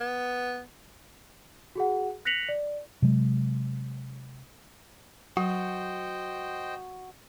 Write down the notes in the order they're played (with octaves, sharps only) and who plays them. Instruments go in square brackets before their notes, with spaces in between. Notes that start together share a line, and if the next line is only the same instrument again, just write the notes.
[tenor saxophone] B3
[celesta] F#4 G#4 F#5
F#6 A#6 B6 C#7 F7 F#7
D5
[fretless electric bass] C3 F#3 G#3
[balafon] F#3 [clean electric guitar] F#4 [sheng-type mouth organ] C5 D#5 G5